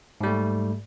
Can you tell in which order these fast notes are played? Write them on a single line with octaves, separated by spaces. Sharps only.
G#2 G3 A3